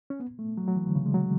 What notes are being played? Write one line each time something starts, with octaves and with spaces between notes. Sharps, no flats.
C#4
B3
A3
F#3
F#3
E3
D3
C#3
G#3
F#3